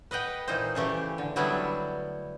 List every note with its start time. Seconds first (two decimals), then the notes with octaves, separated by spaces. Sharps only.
0.11 B4 D#5 F#5 G5
0.48 A#2 E3 D#4 C5
0.75 C#3 E3 A3 G4
1.18 D3
1.36 D3 F#3 G3 B3 D4 E4